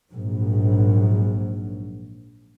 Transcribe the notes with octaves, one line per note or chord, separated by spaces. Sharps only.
A#1 G#2 F#3